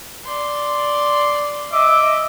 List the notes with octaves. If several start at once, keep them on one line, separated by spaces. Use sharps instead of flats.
D5 C6
D#5 E5 D6